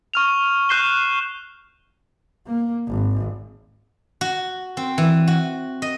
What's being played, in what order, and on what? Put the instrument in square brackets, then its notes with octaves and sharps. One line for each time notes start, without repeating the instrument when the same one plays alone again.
[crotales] C#6 F6 F7
C#6 F#6 G6 C7 E7 G7
[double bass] A#3
G#1
[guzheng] F#4
C4
E3
F#4
D#5